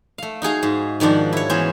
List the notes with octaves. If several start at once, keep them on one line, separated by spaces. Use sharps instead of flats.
A3 F5
D#4 F#4 G#4 F5
G#2
G#2 D#3 F3 D4 F#4
E4 C#5
E3 B3 C#4 C5